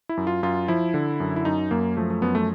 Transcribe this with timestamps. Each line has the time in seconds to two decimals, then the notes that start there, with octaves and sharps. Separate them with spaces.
0.09 E4
0.17 F#2
0.27 F4
0.43 F#2 F4
0.68 F3 E4
0.94 D3
1.20 F#2
1.36 E4
1.45 F#2 D#4
1.71 F#2 A#3
1.97 F3 A3
2.10 A3
2.22 F#2 B3
2.35 A3